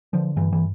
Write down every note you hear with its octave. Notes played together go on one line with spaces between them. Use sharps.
D3 F3
G2 E3
E3